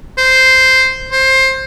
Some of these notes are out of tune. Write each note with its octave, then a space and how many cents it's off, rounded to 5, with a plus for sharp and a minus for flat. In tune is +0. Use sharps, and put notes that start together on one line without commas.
C5 -5
C5 +20